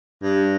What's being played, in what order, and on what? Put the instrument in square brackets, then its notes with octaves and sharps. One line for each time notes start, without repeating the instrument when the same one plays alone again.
[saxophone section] G2